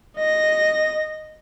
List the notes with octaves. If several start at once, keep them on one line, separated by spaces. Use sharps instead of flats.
D#5 A#6